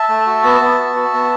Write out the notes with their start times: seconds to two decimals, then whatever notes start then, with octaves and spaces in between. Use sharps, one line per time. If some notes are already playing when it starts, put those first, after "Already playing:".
Already playing: E5 A5
0.09 A3
0.26 F#4
0.44 B3
0.61 B3
0.79 F#4
0.96 F#4
1.14 B3